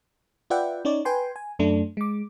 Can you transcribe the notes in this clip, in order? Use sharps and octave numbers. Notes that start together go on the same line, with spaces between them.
F4 B4 D5 E5 F#5 G5
C#4 D#4 C#5 D5
B4 G5 G#5 C6
G#5
F#2 A3 D4
G#3 D6